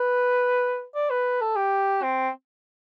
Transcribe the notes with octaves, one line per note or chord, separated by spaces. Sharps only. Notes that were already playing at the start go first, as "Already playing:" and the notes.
Already playing: B4
D5
B4
A4
G4
C4